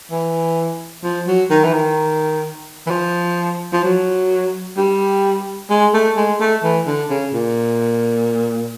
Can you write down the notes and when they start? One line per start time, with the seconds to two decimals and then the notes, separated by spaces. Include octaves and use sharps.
0.11 E3
1.04 F3
1.27 F#3
1.50 D#3
1.64 E3
1.73 D#3
2.87 E3
2.90 F3
3.73 F3
3.84 F#3
4.77 G3
5.70 G#3
5.94 A3
6.17 G#3
6.40 A3
6.64 E3
6.86 D3
7.10 C#3
7.33 A#2